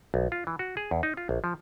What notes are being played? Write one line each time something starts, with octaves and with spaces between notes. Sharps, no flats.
B1
F4
E3
F#4
G#4
E2
D#4
F4
A#1
F3